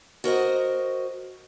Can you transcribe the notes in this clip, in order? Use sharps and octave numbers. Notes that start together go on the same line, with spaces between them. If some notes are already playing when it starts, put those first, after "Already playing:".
F#4 A#4 C5 D#5